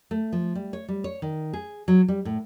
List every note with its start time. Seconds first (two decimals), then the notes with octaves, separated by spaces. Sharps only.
0.11 A3
0.32 F3
0.55 G3
0.73 C#5
0.88 G3
1.04 C#5
1.22 D#3
1.53 G#4
1.88 F#3
2.08 G3
2.25 A2